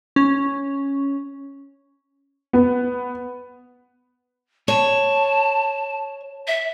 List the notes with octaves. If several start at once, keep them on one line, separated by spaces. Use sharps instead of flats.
C#4
B3
C#5 A5
E5